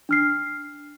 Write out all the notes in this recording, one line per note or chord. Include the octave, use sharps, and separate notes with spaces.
D4 F6 C7